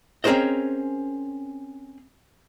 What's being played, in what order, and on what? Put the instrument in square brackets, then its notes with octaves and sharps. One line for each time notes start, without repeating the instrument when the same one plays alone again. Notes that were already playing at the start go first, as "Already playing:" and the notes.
[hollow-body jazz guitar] C4 C#4 G#4 A#4 C5 D#5